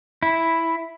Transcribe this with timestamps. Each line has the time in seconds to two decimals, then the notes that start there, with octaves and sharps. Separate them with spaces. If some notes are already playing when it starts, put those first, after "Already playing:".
0.23 E4